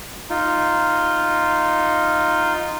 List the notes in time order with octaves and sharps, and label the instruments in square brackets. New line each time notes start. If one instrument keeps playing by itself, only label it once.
[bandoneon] D#4 F4